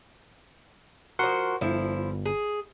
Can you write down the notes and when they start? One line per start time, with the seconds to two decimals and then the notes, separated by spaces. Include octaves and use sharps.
1.19 F3 F#4 A#4 F#5 C6
1.61 G1 F3 E4
2.26 G#4